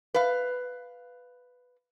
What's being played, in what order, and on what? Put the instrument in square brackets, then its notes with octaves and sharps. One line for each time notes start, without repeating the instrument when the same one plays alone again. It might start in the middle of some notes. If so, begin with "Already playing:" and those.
[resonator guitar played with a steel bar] B4 F5